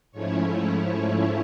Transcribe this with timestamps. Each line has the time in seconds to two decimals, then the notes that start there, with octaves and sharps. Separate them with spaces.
0.12 G#2 F3 A3 C#4 E4 C#5